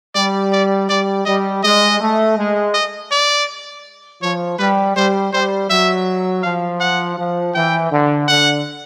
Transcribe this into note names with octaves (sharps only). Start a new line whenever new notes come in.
G3 D5
D5
G3 D5
G3 D#5
G#3 D#5
A3
G#3
D#5
D5
F3 C#5
G3 B4
G3 C5
G3 C5
F#3 E5
F3 F5
F#5
F3
E3 G5
D3
D3 F#5